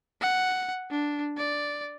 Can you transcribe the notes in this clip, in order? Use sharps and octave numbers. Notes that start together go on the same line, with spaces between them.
F#5
D4
D5